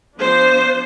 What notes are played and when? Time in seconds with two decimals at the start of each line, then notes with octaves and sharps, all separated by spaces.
0.17 F3 B3 D4 C5